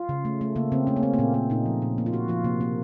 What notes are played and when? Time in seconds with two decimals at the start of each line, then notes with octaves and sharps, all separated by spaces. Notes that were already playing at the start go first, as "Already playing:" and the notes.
Already playing: F4
0.09 C#3
0.25 A3
0.41 A3
0.56 C#3 A#3
0.72 C#3 C4
0.87 A3 C#4
0.96 A#3
1.03 A3 C4
1.14 A#3
1.18 A#2 C4
1.34 A#3
1.50 A#2 D#4
1.66 F3
1.82 A#2
1.98 A#3
2.06 F4
2.13 A#2 F#4
2.28 F3 F4
2.44 C3 A#3
2.61 A#3